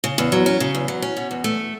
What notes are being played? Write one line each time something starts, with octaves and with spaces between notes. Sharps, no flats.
C#3
E2
F#3
C#4
C#3
E2
F#3
C#4
B2
E2
A3